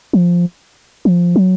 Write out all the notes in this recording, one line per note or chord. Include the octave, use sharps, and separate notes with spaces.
F3
F3
F#3